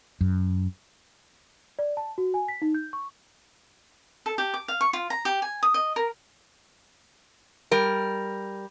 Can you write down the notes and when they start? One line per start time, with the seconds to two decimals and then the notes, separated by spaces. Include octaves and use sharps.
0.21 F#2
1.79 D5
1.97 A5
2.18 F#4
2.34 G#5
2.48 B6
2.62 D#4
2.75 G6
2.93 C#6
4.26 A4
4.38 G4
4.54 D6
4.68 F5
4.81 C#6
4.93 F4
5.10 A#5
5.25 G4
5.42 G#5
5.63 D#6
5.74 D#5
5.96 A#4
7.71 G3 A#4